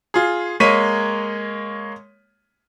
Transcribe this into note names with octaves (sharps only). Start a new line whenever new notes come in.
F4 G#4
G#3 A#3 C#5 B6 D#7